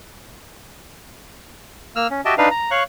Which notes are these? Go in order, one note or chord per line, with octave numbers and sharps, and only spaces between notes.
A#3 E6 F6
C#4
F#4 G4 D#5 E5 G5 A5
D4 D#4 B4 F5
A#5
C#5 F5 C#6 F#6